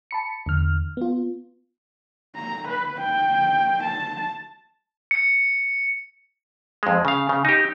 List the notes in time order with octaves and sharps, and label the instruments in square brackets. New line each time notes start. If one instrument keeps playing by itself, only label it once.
[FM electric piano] A5 B5 C#7
E2 D3 F6
B3 F4
[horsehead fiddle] A#5
B4
G5
A5
[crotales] C#7
[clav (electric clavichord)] F2 G#3
C#3 F5
C#3
D#4 G4